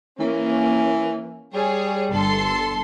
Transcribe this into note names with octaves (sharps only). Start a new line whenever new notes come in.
E3 A#3 C#4
G3 G#4 C#5
G1 A4 C6